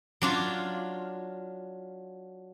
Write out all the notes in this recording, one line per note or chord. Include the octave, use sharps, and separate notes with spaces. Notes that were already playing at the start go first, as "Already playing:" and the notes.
F#3 D4 F4